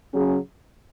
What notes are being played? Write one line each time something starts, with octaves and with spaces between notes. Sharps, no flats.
C#3 F#3 C#4 G#4